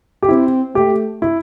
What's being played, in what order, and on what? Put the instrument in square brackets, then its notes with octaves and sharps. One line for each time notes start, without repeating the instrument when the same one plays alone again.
[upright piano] G4
[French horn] C4 [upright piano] E4
[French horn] A3 [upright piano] G4
[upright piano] E4